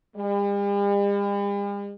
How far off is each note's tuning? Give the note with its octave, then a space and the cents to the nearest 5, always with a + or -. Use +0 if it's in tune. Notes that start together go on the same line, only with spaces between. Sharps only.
G3 +45